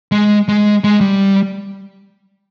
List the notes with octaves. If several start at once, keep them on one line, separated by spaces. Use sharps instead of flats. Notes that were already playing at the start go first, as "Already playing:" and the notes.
G#3
G#3
G#3
G3